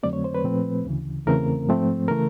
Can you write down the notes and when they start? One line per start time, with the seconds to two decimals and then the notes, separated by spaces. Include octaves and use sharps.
0.03 F2 D3 F#3 A3 C4 D5
0.13 C#5
0.24 C5
0.35 B4
0.44 A#2 F3 A3 C4
0.85 D2 C#3 E3
1.26 E2 C#3 E3 A3 C4 A#4
1.68 G#2 F3 A3 C4
2.08 C#3 E3 A3 A#4